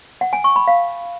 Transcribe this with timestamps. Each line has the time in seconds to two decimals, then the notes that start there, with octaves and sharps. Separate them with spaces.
0.21 F#5
0.33 G#5
0.44 C#6
0.56 B5
0.68 F5